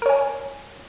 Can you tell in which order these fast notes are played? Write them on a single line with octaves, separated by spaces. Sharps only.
A#4 C#5 G#5